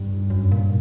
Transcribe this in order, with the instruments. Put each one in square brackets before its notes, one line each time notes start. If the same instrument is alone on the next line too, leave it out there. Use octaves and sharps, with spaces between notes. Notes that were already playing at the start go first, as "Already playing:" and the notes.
Already playing: [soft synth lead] G2
[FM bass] F#2
A#2